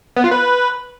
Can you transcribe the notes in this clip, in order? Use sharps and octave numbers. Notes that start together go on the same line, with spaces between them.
B3
F4
B4